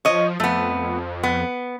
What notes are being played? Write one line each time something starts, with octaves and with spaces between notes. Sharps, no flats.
F3 C#5 D#5
F2 A3 B3
B3